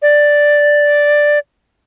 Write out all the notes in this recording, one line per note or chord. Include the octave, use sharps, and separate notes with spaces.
D5